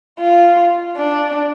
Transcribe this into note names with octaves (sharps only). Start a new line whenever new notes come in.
F4
D4